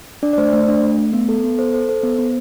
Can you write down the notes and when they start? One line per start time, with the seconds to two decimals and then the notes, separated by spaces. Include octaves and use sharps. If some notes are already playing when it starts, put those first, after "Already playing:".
0.23 D4 D5
0.33 D5
0.38 A3 C5
0.47 D5
0.53 A3 C5
0.68 D4
0.83 A3
0.98 A3
1.13 B3
1.29 A4
1.44 B3
1.58 A4 C5
1.73 A4 C5
1.89 A4 C5
2.03 B3
2.19 B3